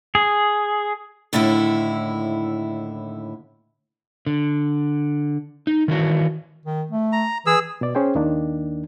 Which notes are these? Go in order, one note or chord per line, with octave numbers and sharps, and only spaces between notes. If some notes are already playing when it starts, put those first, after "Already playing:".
G#4
D#2 A2 D3 A3 E4
D3
D#4
D#3 E3 F#4
D#3
A3
A#5
E3 G#4 E6
B2 D5
C#4 G#4 C5 G5
D#2 D#3 A#3 D4